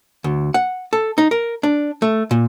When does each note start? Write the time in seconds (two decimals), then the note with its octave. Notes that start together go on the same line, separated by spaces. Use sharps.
0.24 D2
0.54 F#5
0.93 A4
1.18 D#4
1.31 A#4
1.63 D4
2.02 A3
2.31 A#2